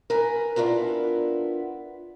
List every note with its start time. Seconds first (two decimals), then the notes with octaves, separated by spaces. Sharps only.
0.10 A#4 B4 G#5
0.56 B3 D4 E4 F4 A#4